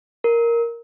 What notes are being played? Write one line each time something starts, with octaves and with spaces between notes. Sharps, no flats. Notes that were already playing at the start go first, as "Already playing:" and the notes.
A#4